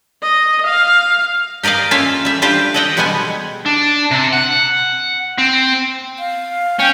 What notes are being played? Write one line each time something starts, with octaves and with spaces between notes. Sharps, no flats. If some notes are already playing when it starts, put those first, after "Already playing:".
D#5
F5
G4 A#4 D5 D#5 F5
A#3 C#4 F4 A4 E5 F5
G3 E5
G3 D4 F4 G4 C5 F5
A4 D5 D#5 F#5 G5
B2 G3 G#3 B3 F#5 G#5
D4
C3
F#5
C4
F5
C#4 G5